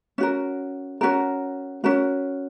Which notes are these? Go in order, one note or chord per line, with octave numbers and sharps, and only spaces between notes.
C#4 F#4 A#4
C#4 F#4 A#4
C#4 F#4 A#4